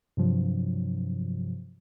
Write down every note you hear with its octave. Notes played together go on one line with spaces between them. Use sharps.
G2 C3 F3 F#3